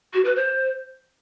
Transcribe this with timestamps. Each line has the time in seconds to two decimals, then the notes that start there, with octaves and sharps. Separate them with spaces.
0.14 F#4
0.25 B4
0.36 C5